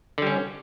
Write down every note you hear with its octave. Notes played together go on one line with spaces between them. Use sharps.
D3 G3 C#4